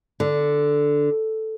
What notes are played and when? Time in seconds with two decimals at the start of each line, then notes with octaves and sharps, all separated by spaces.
0.20 D3